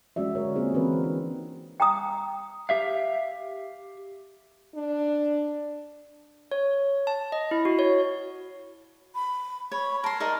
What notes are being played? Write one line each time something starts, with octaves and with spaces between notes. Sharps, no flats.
G#3 C#4 F#4 D5 E5
D3 F#4 A#4 C#5
A#3 C4 C#4 F4 G#4 C5
E3 C4 C#4 F#4 A#4 B4
D4 D#4
G5 A#5 D#6
G4 E5 F5
D4
C#5
A5
D#5
E4
F#4
C#5
B5
C#5 B5
A#4 A5 C6
D#4 A#4 D5